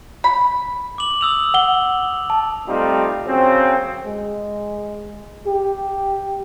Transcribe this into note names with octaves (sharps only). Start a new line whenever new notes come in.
B5
D6 F#7
D#6 E6 F7
F#5 G7
A5
G3 A3 C4 D#4 F4
C#3 F#3 A#3 C4
G#3
G4